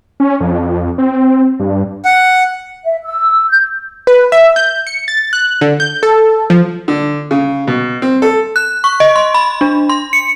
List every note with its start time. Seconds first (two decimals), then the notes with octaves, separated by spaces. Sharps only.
0.20 C#4
0.40 F2
0.98 C4
1.60 G2
2.05 F#5
2.84 E5
3.04 E6
3.49 G6
4.07 B4
4.32 E5
4.56 G6
4.87 C#7
5.08 A6
5.33 F#6
5.61 D3
5.80 G6
6.03 A4
6.50 F3
6.88 D3
7.31 C#3
7.67 B2
8.02 C4
8.22 A4
8.56 F#6
8.84 C#6
9.00 D#5
9.16 C6
9.34 B5
9.61 D4
9.89 C6
10.13 C#7